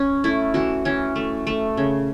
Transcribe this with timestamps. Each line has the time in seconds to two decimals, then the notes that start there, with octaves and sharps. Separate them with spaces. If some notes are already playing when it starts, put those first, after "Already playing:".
Already playing: C#4
0.24 A3 E4
0.54 E3 F#4
0.85 E3 C#4
1.16 A3
1.47 A3
1.77 C#3